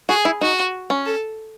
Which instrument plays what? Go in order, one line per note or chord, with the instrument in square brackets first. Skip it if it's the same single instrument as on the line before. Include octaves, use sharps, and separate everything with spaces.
[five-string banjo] F#4 [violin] G#4
[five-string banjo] E4
[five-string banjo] D#4 [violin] F#4
[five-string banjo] C#4
[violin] A4